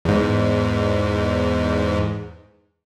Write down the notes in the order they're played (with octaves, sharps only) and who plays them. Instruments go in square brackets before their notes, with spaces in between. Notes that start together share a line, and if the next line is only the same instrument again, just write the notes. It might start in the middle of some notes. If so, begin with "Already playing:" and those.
[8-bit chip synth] E2 G#2